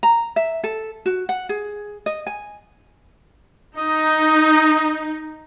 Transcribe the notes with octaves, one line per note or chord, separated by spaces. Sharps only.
A#5
E5
A4
F#4
F#5
G#4
D#5
G#5
D#4 D#5